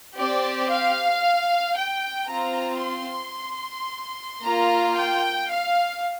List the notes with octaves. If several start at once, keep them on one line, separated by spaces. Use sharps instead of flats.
C4 G4 D5
F5
G5
C4 F4 A#5
C6
A#3 F4 A#5
G5
F5